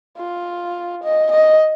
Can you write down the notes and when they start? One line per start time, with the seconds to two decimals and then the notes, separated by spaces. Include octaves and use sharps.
0.18 F4
1.04 D#5
1.31 D#5